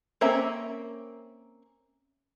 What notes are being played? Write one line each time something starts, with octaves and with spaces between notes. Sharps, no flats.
A#3 C4 C#4 E5 A#5